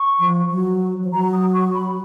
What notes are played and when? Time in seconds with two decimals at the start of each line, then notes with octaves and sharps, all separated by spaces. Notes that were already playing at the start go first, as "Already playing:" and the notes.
Already playing: C#6
0.19 F3
0.51 F#3
1.03 F3
1.12 F#3 A#5
1.33 D#6
1.53 C#6
1.74 B5